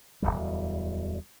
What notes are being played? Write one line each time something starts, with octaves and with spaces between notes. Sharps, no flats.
D1 G#1 E2 G3